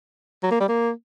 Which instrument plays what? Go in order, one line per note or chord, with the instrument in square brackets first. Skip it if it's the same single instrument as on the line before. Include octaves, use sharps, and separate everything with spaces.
[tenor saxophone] F#3
A#3
G3
A#3